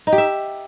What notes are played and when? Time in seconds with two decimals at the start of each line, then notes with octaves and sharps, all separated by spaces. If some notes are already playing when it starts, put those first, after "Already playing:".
0.07 D#4
0.13 G4
0.18 E5